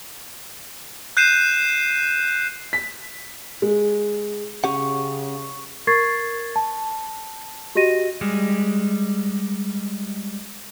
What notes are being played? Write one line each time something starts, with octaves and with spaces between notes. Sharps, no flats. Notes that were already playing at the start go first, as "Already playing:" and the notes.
F#6 G6 C7 D#7 E7
B6
G#3
C#3 C#4 G4 F#5 C#6
A#4 C#6 G#6 A6 C7
A5
F#4 G4 D#5 A#6 D#7
G3 G#3